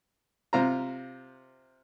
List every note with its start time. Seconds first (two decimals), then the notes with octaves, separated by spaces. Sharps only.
0.53 C3 F4 C5 A#5